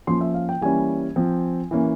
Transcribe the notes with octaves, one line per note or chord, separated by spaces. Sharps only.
F3 A#3 C#4 C6
E5
F5
G5
E3 G3 A#3 C#4 G#5
F3 C4
E3 A#3 C#4